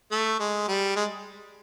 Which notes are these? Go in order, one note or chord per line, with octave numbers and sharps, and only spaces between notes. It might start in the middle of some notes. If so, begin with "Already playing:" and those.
A3
G#3
G3
G#3